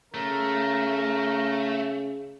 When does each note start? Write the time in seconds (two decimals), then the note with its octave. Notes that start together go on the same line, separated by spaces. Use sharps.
0.14 C#3 A3 A#4